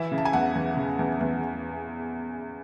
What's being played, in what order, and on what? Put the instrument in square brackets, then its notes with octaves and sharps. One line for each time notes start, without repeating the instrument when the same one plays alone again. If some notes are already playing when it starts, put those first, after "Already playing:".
Already playing: [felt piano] E3 E5
C#3
A5
G#5
E2 F#5
E2
C#3
E2
E2